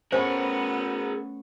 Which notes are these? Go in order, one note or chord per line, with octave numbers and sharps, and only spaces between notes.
A3 B3 C#4 G#4 A#4 C5